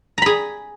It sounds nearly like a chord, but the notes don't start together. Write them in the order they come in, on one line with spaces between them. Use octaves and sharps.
A#5 B5 G#4